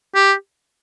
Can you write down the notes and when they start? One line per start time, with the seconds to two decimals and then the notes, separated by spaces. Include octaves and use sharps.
0.15 G4